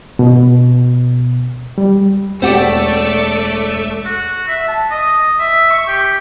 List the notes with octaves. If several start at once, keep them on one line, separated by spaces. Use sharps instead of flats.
B2
G3
E1 A3 C4 F#4 G4 A4 D5 E6
F#4
E5
A5
D#5
E5
C#6
G4